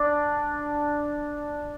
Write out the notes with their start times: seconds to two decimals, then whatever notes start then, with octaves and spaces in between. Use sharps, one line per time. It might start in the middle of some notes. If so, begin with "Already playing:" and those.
Already playing: D4